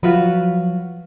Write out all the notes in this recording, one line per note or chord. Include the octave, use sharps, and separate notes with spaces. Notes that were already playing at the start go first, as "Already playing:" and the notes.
F3 F#3 F4 F#4 B4